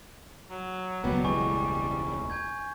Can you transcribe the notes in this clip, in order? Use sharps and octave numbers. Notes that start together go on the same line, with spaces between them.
F#3
E1 C#2 F#3 G3 B3
G#3 G#5 C#6
G#5 G6 G#6